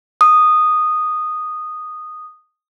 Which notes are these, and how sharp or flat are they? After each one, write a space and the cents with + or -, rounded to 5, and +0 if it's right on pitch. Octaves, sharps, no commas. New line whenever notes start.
D#6 -10